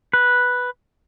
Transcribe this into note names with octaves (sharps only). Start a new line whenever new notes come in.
B4